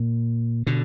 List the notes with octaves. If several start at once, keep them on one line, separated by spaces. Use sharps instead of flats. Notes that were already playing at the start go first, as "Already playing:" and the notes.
Already playing: A#2
B2 D3